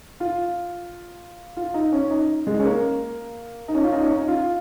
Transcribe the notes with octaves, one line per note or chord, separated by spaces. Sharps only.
F4
F4
D#4
C#4
D#4
G#3
C#4
A#3
D#4
C#4
F4
D#4
C#4
D#4
F4